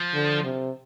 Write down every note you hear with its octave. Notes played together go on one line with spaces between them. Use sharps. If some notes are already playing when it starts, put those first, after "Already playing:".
Already playing: F3
D3
C3